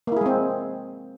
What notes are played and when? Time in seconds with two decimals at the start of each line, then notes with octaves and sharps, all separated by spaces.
0.07 A#3
0.12 E4
0.17 G#4
0.21 G#3
0.26 C4